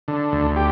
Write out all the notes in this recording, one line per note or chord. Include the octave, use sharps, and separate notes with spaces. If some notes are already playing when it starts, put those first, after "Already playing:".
D3
D2
G4